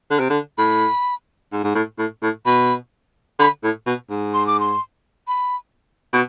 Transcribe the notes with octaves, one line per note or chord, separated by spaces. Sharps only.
D3
C3
D3
A2 B5
G#2
G#2
A2
A2
A2
B2 B5
D3 B5
A2
B2
G#2
C6
D6
C6
B5
B2